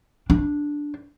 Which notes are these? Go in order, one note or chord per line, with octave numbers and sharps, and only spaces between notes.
D4